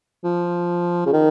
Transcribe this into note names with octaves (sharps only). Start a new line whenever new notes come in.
F3
C#3
D#3